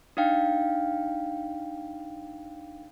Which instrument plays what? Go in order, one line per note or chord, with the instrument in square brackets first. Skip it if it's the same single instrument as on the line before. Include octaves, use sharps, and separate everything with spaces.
[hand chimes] D4 D#4 F5 G5